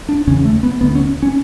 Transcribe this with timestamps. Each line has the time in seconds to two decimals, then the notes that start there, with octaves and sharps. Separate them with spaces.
0.09 D4
0.27 E2 C#3 C#4
0.45 A3
0.63 B3
0.81 D2 D3 B3
0.95 C#4
1.23 C#4